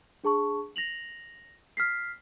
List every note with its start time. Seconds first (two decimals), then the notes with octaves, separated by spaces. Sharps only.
0.24 D4 G#4 A5 C#6
0.76 A#6 F7 F#7
1.77 F6 B6 C7